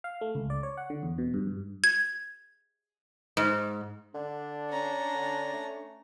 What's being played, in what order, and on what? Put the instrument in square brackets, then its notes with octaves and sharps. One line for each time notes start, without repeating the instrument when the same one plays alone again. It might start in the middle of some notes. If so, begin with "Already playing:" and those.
[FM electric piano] F5
A3
C#2
D5
C#5
F#5
D3
E2
B2
G2
G2
[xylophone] G#6
[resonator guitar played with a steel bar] G#2
[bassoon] D3 [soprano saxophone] D4
[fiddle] C#4 A#5
[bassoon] D3
A3